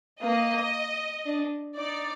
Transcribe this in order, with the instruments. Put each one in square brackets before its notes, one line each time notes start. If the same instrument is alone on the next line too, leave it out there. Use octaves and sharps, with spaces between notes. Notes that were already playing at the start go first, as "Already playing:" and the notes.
[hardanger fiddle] A#3 [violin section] D#5
[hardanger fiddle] D4
[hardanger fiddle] D#4 [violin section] D5